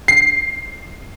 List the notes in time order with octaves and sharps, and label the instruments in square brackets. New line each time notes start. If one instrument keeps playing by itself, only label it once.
[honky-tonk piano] C7